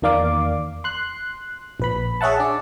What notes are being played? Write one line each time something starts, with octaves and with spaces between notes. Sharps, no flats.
E2 D#3 A#3 D5 F5 D6
C6 F#6
A#1 B4 B5
G#4 C#5 E5 F#5 A5
D4 D5